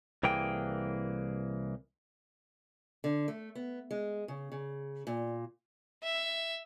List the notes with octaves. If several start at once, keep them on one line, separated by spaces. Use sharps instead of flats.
C2 E3 A#3 G#4 G5
D3
A3
B3
G#3
C#3
C#3
A#2
E5